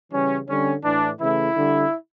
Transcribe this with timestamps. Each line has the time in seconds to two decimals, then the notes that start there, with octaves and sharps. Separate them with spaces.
0.12 C#3 E3 G3 C#4
0.47 D3 G3 C#4
0.83 A2 E3 A3 D4
1.20 C#3 E3 A3 E4
1.55 D3 G3